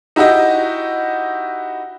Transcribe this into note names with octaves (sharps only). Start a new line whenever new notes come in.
D#4 E4 F#4 G4 D#5